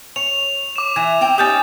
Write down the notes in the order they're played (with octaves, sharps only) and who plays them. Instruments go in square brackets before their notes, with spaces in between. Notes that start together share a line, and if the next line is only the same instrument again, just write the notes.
[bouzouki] C#5 [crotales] F7
[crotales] D6 E7
[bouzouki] E3 [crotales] G#6
[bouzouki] C4 G5
[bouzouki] C#4 D#4 G4 [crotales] D#6 G6 A6